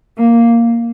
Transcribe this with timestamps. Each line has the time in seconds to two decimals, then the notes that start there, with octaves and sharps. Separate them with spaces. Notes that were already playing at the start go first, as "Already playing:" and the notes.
0.17 A#3